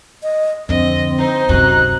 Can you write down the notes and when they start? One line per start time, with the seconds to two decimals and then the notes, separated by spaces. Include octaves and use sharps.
0.23 D#5
0.69 F2 D3 C4 D#5
1.18 D#4 C5
1.49 F#2 C3 F#4 F#6